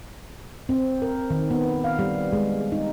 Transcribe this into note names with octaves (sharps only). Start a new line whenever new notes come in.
C4
A#4
D#3
B3
F5
G3
G#3
D#4